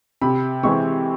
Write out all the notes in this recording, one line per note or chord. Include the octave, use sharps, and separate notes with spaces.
C3 B5
E3 G#3 C4 C#6